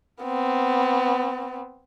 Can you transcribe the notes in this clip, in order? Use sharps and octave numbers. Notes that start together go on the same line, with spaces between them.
B3 C4